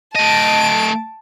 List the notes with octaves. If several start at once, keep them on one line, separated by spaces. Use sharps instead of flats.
A3 D#5 A5 D7